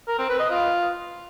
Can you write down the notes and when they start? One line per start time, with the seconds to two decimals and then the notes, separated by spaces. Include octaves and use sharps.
0.08 A#4
0.18 C4
0.29 B4
0.40 D#5
0.50 F4